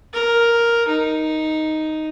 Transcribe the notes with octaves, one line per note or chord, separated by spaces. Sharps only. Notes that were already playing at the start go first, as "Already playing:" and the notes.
A#4
D#4